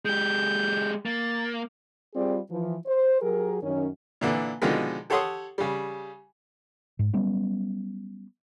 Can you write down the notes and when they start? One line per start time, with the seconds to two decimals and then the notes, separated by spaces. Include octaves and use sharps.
0.05 G#3 G4 G6
1.06 A#3 A6
2.14 G3 C4 F4 G#4 D5
2.50 E3 F3
2.87 C5
3.22 F#3 G4 G#4 A#4
3.63 F#2 D#3 C#4
4.21 A#2 D3 E3
4.62 B2 D3 D#3 F3 G#3
5.10 G4 A4 C#5 F#5 C6 D#6
5.58 C#3 G3
6.99 G#2
7.13 F#3 G3 B3 C#4